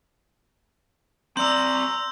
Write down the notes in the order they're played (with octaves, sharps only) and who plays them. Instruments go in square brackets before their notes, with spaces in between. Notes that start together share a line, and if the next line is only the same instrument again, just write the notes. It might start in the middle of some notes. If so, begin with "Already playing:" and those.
[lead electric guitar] C4 D5 [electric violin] A#5 [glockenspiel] C6 [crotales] E6 G6